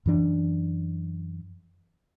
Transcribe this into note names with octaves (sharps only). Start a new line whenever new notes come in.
F#2 E3 D4